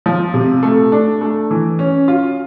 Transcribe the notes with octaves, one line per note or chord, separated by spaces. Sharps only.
F3
C3
A3
D4
A3
E3
C#4
F4